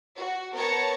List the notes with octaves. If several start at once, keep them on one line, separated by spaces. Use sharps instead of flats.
F#4
B3 A#4 C#5 A5 A#5 C#7